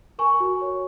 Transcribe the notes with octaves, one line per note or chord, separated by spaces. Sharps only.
A#4 G#5 C#6
F#4
C#5